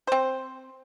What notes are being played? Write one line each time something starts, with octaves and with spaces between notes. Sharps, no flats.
C4 C5